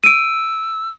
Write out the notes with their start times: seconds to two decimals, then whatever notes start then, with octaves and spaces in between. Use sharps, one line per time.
0.04 E6 D7 D#7